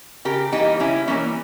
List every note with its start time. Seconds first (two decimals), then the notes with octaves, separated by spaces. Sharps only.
0.25 C#3 G4 A#4
0.52 E3 G3 A#3 D#4 G4
0.80 C#3 C#4 E4
1.07 E3 G3 A#3 C#4